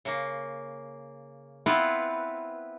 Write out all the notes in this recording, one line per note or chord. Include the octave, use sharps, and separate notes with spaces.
C#3 A#3
B3 C4 E4 F4 B4